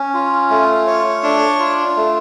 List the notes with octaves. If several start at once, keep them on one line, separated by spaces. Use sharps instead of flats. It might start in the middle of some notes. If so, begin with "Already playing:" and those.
Already playing: C#4
F4
A3
C#5
D4
F4
A3